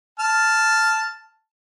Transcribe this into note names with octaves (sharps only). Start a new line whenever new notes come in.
A5 F6